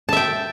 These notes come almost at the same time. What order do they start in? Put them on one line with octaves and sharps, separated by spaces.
A5 E5 G5